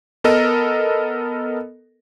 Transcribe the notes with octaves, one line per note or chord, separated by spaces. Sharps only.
B3 A4 A#4 D#5